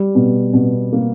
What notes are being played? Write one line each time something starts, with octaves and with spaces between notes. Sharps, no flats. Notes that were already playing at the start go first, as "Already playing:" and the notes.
Already playing: G3
B2
B2
A#3